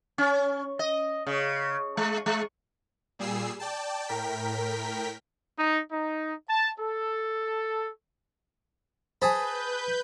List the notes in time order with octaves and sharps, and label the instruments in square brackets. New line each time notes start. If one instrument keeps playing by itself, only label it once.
[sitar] C#4
D#5
C#3
G#3
G#3
[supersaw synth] A#2 G3 G#4 E6 C7
D5 G5 A5
A2 A#4 G5 B6
[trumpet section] D#4
D#4
A5
A4
[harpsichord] G#4 A5 B5 [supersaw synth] B4 G6 [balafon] C5 G#5